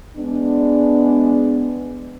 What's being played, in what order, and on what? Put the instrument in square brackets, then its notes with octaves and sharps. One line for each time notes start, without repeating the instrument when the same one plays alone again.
[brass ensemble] G#3 B3 D4